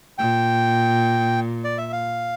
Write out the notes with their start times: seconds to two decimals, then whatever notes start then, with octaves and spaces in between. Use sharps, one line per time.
0.18 A#2 G5
1.64 D5
1.78 E5
1.92 F5